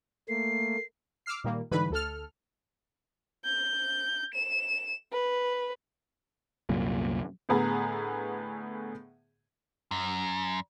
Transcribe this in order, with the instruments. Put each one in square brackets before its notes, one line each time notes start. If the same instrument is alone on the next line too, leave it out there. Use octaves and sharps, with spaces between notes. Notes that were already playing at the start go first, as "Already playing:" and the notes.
[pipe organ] A3 A#3 [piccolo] C7
[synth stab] D6 E6 F6 C7
A#2 D#3 G3 A#3
G#2 D3 E3 G3 B4 B5
D2 A4 F6
[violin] G6
E7
B4
[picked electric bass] C2 F#2 A#2
[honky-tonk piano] A2 D3 B3 G#4 A#5
[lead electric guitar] F#2